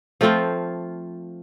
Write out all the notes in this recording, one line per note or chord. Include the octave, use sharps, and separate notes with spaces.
F3 A3 C4 F4